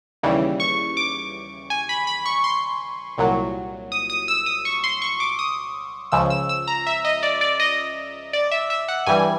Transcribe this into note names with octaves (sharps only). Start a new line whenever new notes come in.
D#2 C#3 E3 G3
C#6
D6
G#5
B5
B5
C#6
C6
C2 A#2 F#3
D#6
D#6
E6
D#6
C#6
C6
C#6
D6
D#6
C#2 C#3 F3 E6
E6
E6
A#5
E5
D#5
D5
D5
D#5
D5
E5
E5
F#5
G2 E3 G3 G#5